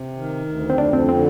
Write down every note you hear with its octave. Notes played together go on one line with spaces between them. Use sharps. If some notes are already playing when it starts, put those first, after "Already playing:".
Already playing: C3
D#3
D2
C4
F2 D4
C4
D3 C4